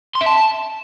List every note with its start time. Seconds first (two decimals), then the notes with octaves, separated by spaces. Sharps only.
0.15 C6
0.21 E5
0.26 A5